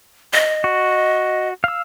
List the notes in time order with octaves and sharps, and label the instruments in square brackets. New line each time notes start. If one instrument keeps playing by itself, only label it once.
[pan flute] D#5
[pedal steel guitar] F#4
F5 E6